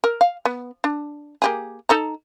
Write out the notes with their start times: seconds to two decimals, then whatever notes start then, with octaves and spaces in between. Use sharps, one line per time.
0.04 A#4
0.21 F5
0.45 B3
0.84 D4
1.42 A#3 G4 G#4
1.89 D#4 A4 A#5